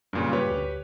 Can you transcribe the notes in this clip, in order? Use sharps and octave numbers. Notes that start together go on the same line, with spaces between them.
F#1 G2 A#2 C#3
G4 B4 C#5
D2